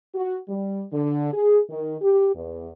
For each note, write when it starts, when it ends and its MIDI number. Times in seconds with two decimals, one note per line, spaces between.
0.15 0.37 66
0.48 0.83 55
0.92 1.29 50
1.32 1.58 68
1.69 1.95 51
2.01 2.33 67
2.35 2.69 40